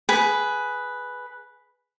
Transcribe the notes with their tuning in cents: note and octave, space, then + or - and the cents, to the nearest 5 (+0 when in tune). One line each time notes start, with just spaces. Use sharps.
G#4 +10 B4 +0